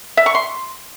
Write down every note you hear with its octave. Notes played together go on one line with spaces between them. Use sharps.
E5
C#6
C6